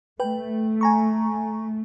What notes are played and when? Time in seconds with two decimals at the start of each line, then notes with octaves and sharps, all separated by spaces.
0.20 A3 B4 G5
0.81 G#5 A#5 C#6